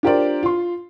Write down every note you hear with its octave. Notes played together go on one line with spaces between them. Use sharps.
D4 F4 G4 A#4 C5 D5
F4 C6